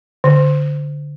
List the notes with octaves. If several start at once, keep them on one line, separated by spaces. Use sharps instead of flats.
D3